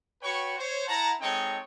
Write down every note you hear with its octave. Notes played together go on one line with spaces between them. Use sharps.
F#4 B4 C#5 G5 C#6
C5 C#5
E4 F#5 A5 A#5
G#3 C4 D#4 A4 C#5 G5